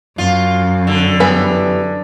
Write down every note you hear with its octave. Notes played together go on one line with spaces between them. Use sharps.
F#2 F4
D3
E3 G3 B3